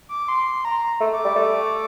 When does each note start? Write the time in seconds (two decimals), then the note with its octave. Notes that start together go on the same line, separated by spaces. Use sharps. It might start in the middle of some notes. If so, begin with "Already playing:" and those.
0.09 D6
0.28 C6
0.65 A#5
1.00 A3
1.12 D6
1.25 G3
1.36 A3